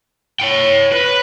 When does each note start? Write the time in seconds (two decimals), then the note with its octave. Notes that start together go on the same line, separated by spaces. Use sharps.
0.40 C#5 G5
0.92 B4